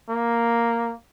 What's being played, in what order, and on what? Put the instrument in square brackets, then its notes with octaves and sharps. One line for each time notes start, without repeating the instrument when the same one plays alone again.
[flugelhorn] A#3